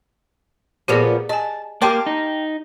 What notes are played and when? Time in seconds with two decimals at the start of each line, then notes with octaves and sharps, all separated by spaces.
0.88 A#2 F3 B3 G4 G#4 D5
1.29 D#5 G#5 A5
1.82 A#3 G4 F5 G5 A5 C6 D6
2.06 D#4